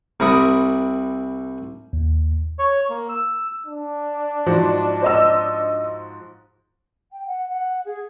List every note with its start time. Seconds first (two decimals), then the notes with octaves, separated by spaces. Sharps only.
0.20 C2 C3 A#4 B5 C#6 D#6
1.93 D#2
2.59 C#5
2.89 A#3
3.09 E6
3.67 D4
4.46 G#2 F3 F#4
5.02 C5 D#5 E6
7.11 G5
7.26 F#5
7.48 F#5
7.85 G#4